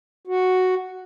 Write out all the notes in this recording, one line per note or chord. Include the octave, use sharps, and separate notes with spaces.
F#4